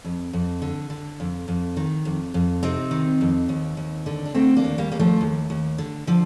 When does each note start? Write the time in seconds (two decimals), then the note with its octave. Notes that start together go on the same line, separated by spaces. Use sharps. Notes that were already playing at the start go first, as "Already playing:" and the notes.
0.05 F2
0.33 F2
0.62 D3
0.90 D3
1.20 F2
1.48 F2
1.77 D#3
2.05 F2
2.34 F2
2.63 C3 C4 D#4
2.91 D#3
3.21 F2
3.49 D#2
3.77 D#2
4.06 D3
4.25 D4
4.34 D3 A3 C4
4.57 A#3 D4
4.64 D#2
4.78 G3 A#3
4.92 D#2 A#3
4.99 F3 A3
5.21 D#2
5.50 D#2
5.78 D3
6.07 D3 F3